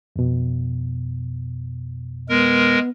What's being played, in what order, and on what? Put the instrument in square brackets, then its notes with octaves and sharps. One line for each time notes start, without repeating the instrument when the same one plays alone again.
[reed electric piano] F2 B2
[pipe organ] G#3 A#4 [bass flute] B3